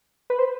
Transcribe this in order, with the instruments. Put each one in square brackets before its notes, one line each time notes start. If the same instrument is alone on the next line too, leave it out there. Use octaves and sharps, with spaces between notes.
[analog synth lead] B4
C5